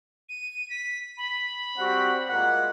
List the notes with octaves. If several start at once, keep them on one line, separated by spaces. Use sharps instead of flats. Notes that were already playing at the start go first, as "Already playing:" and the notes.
D#7
B6
B5
G3 C4 F#4 F#5
A#2 G#3 A#3 F#5